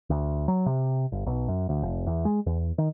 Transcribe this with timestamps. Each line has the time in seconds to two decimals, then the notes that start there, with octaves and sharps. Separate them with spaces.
0.10 D2
0.48 F#3
0.66 C3
1.12 G1
1.26 B1
1.48 F#2
1.69 D2
1.83 F1
2.07 E2
2.25 G#3
2.46 E2
2.78 D#3